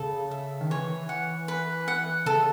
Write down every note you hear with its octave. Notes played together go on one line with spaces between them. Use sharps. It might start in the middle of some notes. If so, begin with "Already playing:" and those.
Already playing: C#3 A4
E5
D#3
E3 C#5
F#5
B4
F#5
C#3 A4